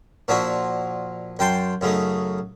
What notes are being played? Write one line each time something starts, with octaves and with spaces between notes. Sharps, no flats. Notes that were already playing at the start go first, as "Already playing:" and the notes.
A#2 F3 D4 E4 F#4
F#2 G5 A5 C6
F#2 C#3 A3 D#4